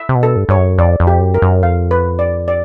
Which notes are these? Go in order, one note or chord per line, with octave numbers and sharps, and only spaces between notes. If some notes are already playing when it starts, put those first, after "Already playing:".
Already playing: E5
C3
B2
A4
G2
G2 C#5
F#2
F2 D5
F2
G4
F#2
A#4
F#2
F2 F5
B4
D5
D5